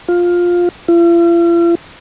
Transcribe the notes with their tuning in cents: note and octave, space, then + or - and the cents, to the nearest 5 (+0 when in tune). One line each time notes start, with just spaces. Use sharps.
F4 +10
F4 -45